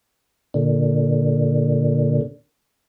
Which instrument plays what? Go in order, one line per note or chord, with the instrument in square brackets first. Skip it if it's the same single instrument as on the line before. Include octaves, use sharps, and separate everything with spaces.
[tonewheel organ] A#2 D3